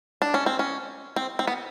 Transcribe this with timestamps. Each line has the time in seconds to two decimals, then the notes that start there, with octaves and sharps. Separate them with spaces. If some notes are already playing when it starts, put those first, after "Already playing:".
0.22 D4
0.34 C#4
0.46 C4
0.59 C#4
1.16 C4
1.39 C4
1.47 B3